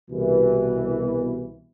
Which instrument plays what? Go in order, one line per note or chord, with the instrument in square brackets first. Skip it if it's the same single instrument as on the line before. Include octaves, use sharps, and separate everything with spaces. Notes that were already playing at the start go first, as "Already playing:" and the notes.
[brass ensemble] C2 B2 E3